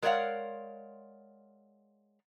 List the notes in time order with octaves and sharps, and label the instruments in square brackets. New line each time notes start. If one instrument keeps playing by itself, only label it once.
[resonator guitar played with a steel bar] G#3 A#4 C#5 D5 F5 F#5